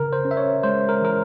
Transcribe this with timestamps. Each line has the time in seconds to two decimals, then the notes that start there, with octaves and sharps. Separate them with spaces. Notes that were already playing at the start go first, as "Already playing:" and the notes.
Already playing: C#3 A#4
0.13 C5
0.25 C#4
0.31 E5
0.37 C#5
0.63 G#3 C5
0.89 A#4
1.02 E3 A#4